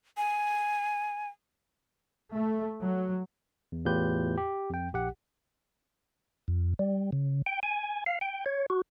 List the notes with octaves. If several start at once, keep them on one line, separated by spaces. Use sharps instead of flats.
G#5
A3
F#3
E2
E2 A2 F4 G4 B4 G6
G4
F2 G5
A#1 G4 F#5
F2
G3
C#3
G5
G#5
F5
G5
C#5
F#4